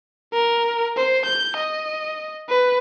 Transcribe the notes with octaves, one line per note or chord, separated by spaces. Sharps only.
A#4
C5
G6
D#5
B4